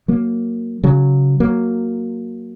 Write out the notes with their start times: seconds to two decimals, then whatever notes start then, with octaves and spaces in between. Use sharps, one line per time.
0.08 F#3 A#3
0.83 C#3 F#3
1.40 F#3 A#3